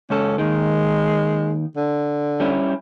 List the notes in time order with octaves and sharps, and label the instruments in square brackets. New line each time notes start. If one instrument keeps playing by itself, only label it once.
[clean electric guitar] C#2 A4 [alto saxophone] C#4
[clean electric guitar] D#2 D#3 [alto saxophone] G#3
[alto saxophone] D3
[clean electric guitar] G3 C#4 E4